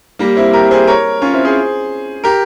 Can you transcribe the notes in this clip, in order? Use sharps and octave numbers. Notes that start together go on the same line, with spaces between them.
G3 A#3
C4 E4
G4 A#4
G#4 C5
A#4 C#5
C#4 F4
C4 E4
G#4 C5
G4 A#4